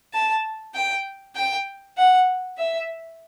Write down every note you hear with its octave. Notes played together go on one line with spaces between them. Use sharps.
A5
G5
G5
F#5
E5